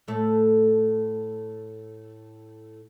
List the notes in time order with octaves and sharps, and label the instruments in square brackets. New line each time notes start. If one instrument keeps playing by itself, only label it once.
[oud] A2 A3